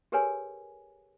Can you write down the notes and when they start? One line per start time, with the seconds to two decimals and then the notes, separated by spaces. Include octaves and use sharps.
0.12 G4 G#4 A#4 B4 C#5 G#5